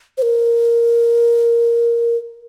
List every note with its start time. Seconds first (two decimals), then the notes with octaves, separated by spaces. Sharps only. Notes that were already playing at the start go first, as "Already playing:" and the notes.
0.18 C5
0.22 A#4